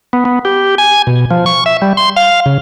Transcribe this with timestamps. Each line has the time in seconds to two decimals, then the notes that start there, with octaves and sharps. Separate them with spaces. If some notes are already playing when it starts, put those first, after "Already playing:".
0.13 B3
0.25 B3
0.45 G4
0.78 G#5
1.07 B2
1.31 F3
1.46 C#6
1.66 E5
1.82 G3
1.97 C6
2.16 F5
2.46 C#3